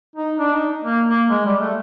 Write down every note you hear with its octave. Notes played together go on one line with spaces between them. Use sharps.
D#4
D4
D#4
A#3
A#3
G#3
G3
A3